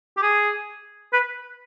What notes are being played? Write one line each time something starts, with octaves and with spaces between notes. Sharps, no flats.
G4
G#4
B4